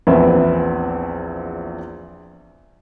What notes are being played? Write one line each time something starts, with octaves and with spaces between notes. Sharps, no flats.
A#1 E2 C4 B4 E5